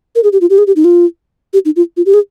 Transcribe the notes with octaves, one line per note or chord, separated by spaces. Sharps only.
A#4
G#4
G4
F4
G4
G#4
G4
D#4
F4
G4
D#4
F4
F4
G4
G#4